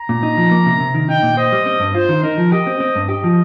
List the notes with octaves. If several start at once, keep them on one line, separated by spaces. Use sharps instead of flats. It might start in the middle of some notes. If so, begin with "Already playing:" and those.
Already playing: A#5
A#2
D#4
F3
A#3
C3
C3
D#3
D#4 G5
A#2
C5 D#5
G3
C4
G2
F4 C5
D#3
D#4 A#4
F3
G4 D#5
C4
C4
G2
G4 D#5
F3